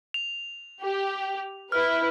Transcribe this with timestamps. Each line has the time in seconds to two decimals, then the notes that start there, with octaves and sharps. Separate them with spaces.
0.14 F7
0.81 G4
1.72 E4 B4 F6